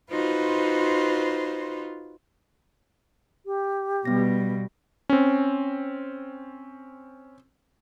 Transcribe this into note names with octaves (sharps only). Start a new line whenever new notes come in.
D#4 F4 F#4 B4 C5
G4
B2 G3 B3 A#6
C4 C#4